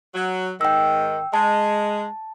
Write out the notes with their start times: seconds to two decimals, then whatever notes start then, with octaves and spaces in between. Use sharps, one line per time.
0.15 F#3
0.61 G#2 D#3 G5 E6
1.34 G#3 A5